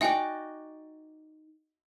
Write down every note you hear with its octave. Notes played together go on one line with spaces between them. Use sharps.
D#4 F#4 D5 E5 G5 G#5